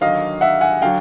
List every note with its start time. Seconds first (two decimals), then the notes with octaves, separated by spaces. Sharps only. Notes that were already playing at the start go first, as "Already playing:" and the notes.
0.01 D#2 D3 F#3 D#5 F5
0.41 E5 F#5
0.61 F#5 G#5
0.82 D3 F#3 F5 G5